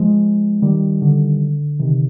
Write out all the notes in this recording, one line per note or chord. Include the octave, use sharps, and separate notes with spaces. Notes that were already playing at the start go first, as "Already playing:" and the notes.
Already playing: F3 G#3
D#3 G3
D3
C3 D#3